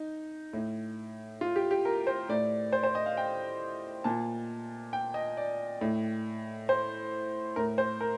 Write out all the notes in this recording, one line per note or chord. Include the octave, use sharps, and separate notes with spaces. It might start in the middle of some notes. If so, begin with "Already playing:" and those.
Already playing: D#4
A2
F4
G4
G4
A#4
C5
A2 D5
C5
C5
D#5
F5
G5
A#2 A5
G5
D#5
D5
A2
C5
A2 A#4
C5
A#4